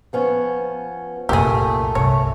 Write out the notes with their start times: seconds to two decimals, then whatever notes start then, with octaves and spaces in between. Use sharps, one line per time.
0.13 F3 B3 C#4
1.29 C2 F#2 A#2 A3 G4 G#4
1.95 G2 C3 C#5